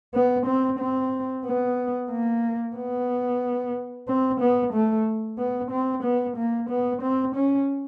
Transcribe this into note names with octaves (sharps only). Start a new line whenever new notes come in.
B3
C4
C4
B3
A#3
B3
C4
B3
A3
B3
C4
B3
A#3
B3
C4
C#4